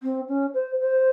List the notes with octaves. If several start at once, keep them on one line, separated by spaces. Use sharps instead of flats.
C4
C#4
C5
C5